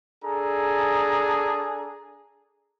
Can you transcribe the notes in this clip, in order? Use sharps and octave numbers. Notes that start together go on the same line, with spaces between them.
D4 G#4 A4 A#5